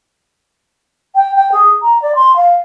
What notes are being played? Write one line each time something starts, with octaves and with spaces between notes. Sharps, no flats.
G5
G5
G#4
A#5
D5
C6
F5